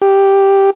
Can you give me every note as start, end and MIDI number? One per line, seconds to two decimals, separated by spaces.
0.02 0.70 67